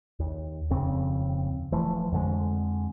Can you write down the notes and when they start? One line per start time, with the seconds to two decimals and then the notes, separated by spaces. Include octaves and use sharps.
0.19 D#2
0.70 D#1 F2 C#3 C4
1.72 D#1 E3 F3 A3
2.12 F2 D3 G#3